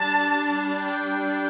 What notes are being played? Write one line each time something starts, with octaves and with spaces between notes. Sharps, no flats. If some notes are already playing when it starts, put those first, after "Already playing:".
Already playing: G3 D4 A5
G5